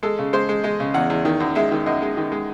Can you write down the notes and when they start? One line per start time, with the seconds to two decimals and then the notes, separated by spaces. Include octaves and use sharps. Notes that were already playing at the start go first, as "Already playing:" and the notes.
0.03 G#3 A4
0.19 C#3
0.33 G#3 C5
0.49 G#3
0.64 G#3 D#5
0.80 C#3
0.94 E2 F#5
1.10 E2
1.25 D#3
1.40 F#2
1.55 G#3 E5
1.71 D#3
1.86 F#2 D#5
2.02 G#3
2.17 D#3
2.32 G#3